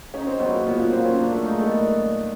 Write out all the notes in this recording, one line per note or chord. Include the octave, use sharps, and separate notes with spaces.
C#4 D#4
C4
F#3 B3
A#3
A#2 B3
B3
A#3 C4
C#4
A#3 D4
A3
G#3 D#4
A3
B3